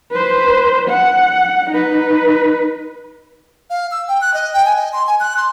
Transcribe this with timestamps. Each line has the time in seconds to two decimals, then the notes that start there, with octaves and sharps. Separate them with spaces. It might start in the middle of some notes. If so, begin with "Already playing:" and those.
0.11 B4 C5
0.89 F#5
1.70 D#4 B4
3.70 F5
3.91 E6
4.08 G5
4.21 F#6
4.34 D#5
4.53 G5
4.65 G#5
4.77 D#5
4.93 C6
5.07 G#5
5.20 F#6
5.37 C6